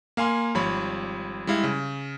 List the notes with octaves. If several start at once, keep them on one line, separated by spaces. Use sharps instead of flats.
A#3 F5 G#5 C6
G#1 F3 G3 C#5 B5
G3 G#3 E4 F5
C#3